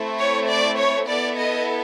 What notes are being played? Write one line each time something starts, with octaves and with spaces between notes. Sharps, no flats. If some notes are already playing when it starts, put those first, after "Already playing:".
Already playing: A3 C4 E4
C#5
D5
C#5
B3 E4 A4 D5
D#5